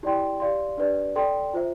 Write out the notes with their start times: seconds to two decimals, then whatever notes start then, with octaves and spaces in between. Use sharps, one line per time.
0.03 E4 G4 D5 G5 C6
0.40 G4 D5 F5 C6
0.78 D4 G4 B4 D5
1.15 A4 D5 G5 C6
1.54 F4 C5 E5